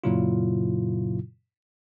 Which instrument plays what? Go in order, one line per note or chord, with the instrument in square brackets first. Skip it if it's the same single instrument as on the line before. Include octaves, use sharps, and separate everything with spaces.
[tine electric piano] F#2 A#2 C#3 F#3 E4 F4